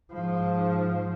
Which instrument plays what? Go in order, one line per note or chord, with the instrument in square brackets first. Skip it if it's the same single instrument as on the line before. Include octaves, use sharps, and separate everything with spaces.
[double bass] G#2 F3